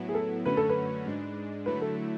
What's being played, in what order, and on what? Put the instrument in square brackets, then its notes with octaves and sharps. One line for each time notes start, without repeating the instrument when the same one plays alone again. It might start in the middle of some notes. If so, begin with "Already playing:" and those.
Already playing: [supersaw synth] A2 F#3 B3 E4
[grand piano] G#4
A4
[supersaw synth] F#2 D3 A3 C#4 F#4 [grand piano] B4
[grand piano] A4
B4
[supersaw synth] G#2 G#3 D4
[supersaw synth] D3 F#3 A3 E4 [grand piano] B4
[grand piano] A4